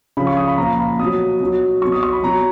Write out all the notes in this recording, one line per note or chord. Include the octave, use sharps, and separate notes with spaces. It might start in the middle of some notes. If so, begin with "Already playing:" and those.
C#3 F3 B5
C#6
D#6
B5
A#2 F3 A#5
B5
B2 F#3 D#6
B2 F#3
B2 F#3 C#6
D#6
C#6
B5
B2 F#3 A#5